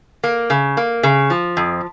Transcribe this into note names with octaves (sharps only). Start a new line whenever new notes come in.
A#3
C#3
A#3
C#3
F3
F2